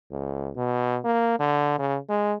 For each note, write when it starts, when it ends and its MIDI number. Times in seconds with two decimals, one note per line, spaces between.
0.12 0.51 37
0.57 0.99 47
1.05 1.39 58
1.40 1.77 50
1.79 1.98 49
2.10 2.34 56